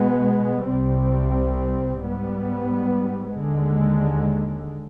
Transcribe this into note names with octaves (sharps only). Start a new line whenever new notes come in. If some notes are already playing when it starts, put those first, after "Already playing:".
Already playing: B2 G#3 B3
C2 C3 G3 C4
G#2 G3 B3
D#2 D3 G#3